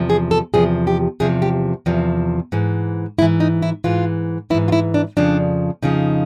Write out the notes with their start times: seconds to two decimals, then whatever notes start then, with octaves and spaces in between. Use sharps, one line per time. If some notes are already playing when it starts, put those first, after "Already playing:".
Already playing: E2 C3 F3
0.10 G#4
0.31 A4
0.54 E2 C3 F3 G#4
0.87 G4
1.20 E2 C3 F3 G#4
1.42 G4
1.86 E2 C3 F3
2.52 G#2 E3
3.18 G#2 E4
3.22 E3
3.40 D#4
3.62 E4
3.84 G#2 E3 F4
4.50 E3 E4
4.54 G#2
4.68 F4
4.72 E4
4.94 D4
5.17 F2 C#3 F3 D4
5.82 F2 C#3 F3 D#4